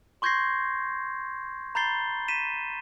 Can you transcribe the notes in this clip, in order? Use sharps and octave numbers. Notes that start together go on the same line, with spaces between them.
C6 C#6 G6 G#6 A#6 C7
A#5 B5 G6 A6 C7 G7
B6 D#7 E7